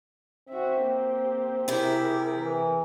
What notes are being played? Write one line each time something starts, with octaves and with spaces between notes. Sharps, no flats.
C4 F#4 E5
A#3 G4
C3 E4 G4 G#4 A#4
E3